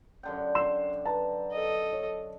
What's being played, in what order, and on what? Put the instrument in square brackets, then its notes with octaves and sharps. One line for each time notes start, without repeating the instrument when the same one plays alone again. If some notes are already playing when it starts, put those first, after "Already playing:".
[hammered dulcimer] F#2 D3 G5
[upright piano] C6 E6 E7
B4 A5 A#5
[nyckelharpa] A4 D#5
[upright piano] C#5